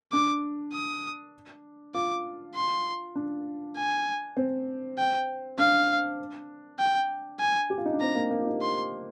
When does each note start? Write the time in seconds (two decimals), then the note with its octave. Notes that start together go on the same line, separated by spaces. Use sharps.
0.12 D4 D6
0.73 D#6
1.94 F4 D6
2.56 C6
3.16 D4
3.77 G#5
4.37 C4
4.98 G5
5.58 D4 F5
6.79 G5
7.40 G#5
7.70 G4
7.78 F4
7.86 D#4
7.93 D4
8.01 C4 A#5
8.15 A#3
8.31 A#3
8.39 F4
8.46 D#4
8.61 C6